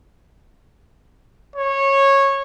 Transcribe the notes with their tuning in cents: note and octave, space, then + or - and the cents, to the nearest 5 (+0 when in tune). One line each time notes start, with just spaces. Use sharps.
C#5 -15